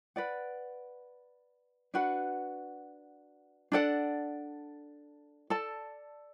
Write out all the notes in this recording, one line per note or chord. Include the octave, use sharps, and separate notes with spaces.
B4 D5 F#5
D4 F#4 B4 F#5
D4 A4 D5 F#5
A4 D5 A5